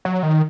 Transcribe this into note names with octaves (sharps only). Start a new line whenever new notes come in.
F#3
D#3